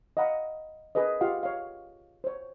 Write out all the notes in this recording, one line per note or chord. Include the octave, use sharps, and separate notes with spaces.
D#5 F5 F#5 A#5 B5
G#4 A#4 B4 D#5
F4 G4 F5 F#5
C#5 F5
C5 C#5